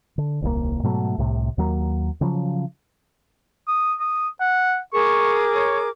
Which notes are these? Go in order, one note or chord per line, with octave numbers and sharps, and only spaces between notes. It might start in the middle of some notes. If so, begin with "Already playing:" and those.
D3
D#1 C2 D3 A#3
G#2 B2 F#3 A3
C2 A2 C3
D#2 F#3 A#3
C#3 F3 F#3
D#6
D#6
F#5
G#4 A#4 C#6 D6
C#5